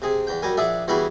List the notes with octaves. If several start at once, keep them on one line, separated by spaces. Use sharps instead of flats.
C3 G#4
E2 G5
F#2 G3 A#4 G#5
A#1 G#4 D5 E5 F#5 D6
E3 G3 B3 E4 F#4 G#4